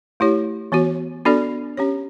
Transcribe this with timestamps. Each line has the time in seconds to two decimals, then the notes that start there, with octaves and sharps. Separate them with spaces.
0.20 A3 E4 G4 C#5
0.72 E3 B3 F#4 C#5
1.25 B3 D4 F#4 A4 D5
1.77 C#4 G4 C#5